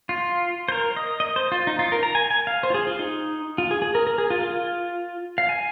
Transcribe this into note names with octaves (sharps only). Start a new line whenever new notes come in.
F4
C5
A#4
D#5
D#5
C5
F4
D#4
F4
A#4
A#5
G#5
G#5
F5
C5
F4
G#4
F4
D#4
F4
G#4
G#4
A#4
A#4
G#4
F4
F4
F5
G#5